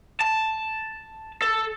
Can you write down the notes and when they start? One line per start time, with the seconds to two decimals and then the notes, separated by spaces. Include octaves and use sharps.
0.21 A5
1.42 A4